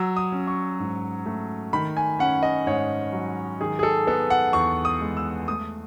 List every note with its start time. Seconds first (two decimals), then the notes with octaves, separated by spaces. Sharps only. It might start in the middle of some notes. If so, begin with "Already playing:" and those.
Already playing: F#3 E6
0.17 D#6
0.32 C#4
0.47 C#6
0.80 G#2
1.26 A3
1.73 D#3 B5
1.97 G#5
2.19 C#4 F#5
2.43 D#5
2.67 G#2 C#5
3.13 F#3
3.60 D#3 G#4
3.79 G#4
3.83 A4
4.07 B3 A4
4.30 F#5
4.53 E2 C#6
4.85 D#6
5.01 G#3
5.17 E6
5.48 A3 D#6